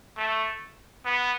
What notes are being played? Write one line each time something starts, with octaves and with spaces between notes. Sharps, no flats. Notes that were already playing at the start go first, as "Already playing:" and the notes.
A3
B3